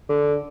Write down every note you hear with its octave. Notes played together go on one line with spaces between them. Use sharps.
D3